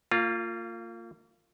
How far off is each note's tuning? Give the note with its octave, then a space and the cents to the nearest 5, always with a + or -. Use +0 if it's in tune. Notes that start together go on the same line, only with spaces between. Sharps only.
A#3 -35 F4 +0